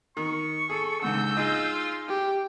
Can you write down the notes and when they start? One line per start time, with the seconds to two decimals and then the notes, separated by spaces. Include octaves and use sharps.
0.17 D#3 C#6
0.70 G#4 A4
1.02 C#2 G#2 D3 E6 G6
1.37 D#4 F4 G#4
2.08 G4